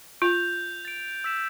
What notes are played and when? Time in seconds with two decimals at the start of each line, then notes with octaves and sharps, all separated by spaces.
0.22 F4 G6 F7
0.85 A6 D7
1.24 E6 B6 E7